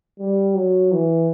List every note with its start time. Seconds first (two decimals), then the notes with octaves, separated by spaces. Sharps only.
0.19 G3
0.55 F#3
0.92 E3